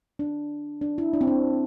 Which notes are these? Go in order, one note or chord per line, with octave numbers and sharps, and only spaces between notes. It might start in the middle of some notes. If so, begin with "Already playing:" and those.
D4
D4
E4
D4
C4
D4